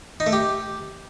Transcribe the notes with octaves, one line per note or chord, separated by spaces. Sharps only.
D#4
A3
G4